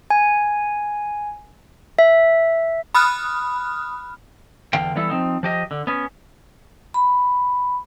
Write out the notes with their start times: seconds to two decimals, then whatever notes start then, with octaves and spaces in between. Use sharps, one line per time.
0.10 G#5
1.99 E5
2.95 B5 D#6 F6 F#6
4.73 E2 D3 F5 G5
4.95 E3 G3 B3 E4 A4
5.10 F3 C4 D#4
5.43 F3 G4 D#5
5.71 D3
5.87 B3 C#4
6.94 B5